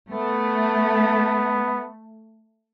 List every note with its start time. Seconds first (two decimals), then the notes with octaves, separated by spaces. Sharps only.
0.12 A3 B3